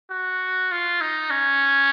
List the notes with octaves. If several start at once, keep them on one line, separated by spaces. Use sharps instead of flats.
F#4
F4
D#4
C#4